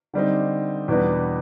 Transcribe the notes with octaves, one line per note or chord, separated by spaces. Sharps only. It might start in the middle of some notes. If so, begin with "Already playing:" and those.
D3 G3 C4 D#4
E2 B2 G3 B3 D4